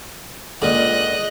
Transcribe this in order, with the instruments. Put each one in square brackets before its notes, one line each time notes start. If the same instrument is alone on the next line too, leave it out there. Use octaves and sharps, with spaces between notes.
[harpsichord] C#2 A#2 D3 [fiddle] D#5 F#6